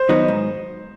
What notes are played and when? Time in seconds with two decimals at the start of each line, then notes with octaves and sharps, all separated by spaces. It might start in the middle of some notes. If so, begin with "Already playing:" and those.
Already playing: C5
0.09 D#3 F#3 B3 D#4
0.28 G#2